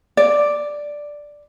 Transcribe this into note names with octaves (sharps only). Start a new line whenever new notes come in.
D5